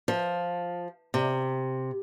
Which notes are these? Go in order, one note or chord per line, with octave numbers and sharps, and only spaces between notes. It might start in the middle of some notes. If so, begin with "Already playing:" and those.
F3
C3